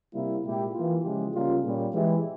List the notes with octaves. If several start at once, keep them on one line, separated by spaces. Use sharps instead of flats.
C3 G3 A#3 E4
A#2 G#3 E4 G4
E3 A#3 F4
C#3 F3 G#3 E4 G4
C#3 G3 A#3 C#4 F4
A#2 G3 C#4
E3 G#3 E4 G4